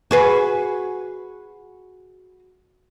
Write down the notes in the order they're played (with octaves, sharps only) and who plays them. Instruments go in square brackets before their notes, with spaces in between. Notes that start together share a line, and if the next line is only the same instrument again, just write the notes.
[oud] F#4 G#4 B4